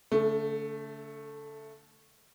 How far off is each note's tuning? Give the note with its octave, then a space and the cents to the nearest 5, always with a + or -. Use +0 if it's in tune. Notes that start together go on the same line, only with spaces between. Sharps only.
D3 -45 A3 +0